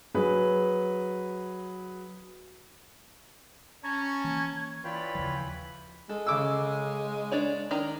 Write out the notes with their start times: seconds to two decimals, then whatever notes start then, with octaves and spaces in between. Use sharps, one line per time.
0.14 F#3 G#4 B4
3.84 C#4 A5 A#5 C#6 G#6
4.24 E3 A#3
4.84 E3 F4 B4 C#5 D5 G5 B5
5.15 D#2 C#3 F3
6.10 G#3 A4
6.27 C#3 D6 E6
7.32 D4 C#5 D5
7.71 D#3 D4 A#5